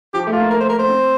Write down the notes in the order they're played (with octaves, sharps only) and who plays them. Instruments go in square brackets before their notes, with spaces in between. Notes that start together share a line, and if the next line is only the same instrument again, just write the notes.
[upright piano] F3 [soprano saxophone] G4
[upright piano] A3 [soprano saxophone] G4
[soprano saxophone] F4
[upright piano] A#3
[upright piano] A#3 [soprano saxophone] A#4
[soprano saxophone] C5
A#4
C5
[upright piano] C4